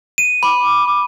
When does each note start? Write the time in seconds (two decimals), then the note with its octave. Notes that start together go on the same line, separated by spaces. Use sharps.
0.18 D#7
0.43 B5 D6